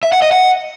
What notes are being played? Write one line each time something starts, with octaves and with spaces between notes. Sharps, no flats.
E5
F#5
D#5
F#5